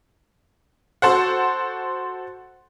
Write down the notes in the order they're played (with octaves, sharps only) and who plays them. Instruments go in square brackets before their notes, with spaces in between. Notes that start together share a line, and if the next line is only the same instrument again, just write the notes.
[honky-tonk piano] F#4 A4 C5 F#5